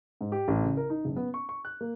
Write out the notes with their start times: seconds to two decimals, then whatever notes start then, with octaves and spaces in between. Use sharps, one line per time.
0.21 G#2
0.32 G4
0.48 A1
0.63 C#3
0.77 A#4
0.90 D#4
1.05 F#1
1.16 B3
1.34 C#6
1.49 C#6
1.65 F#6
1.81 A#3